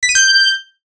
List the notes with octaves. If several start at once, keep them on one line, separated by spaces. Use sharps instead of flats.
B6
D#7
G6